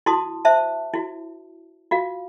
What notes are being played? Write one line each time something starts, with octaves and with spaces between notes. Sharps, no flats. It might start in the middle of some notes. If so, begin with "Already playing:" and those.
E4 F#4 A5 C6 D#6
C5 E5 A5
E4 F#4
F4 F#4 F5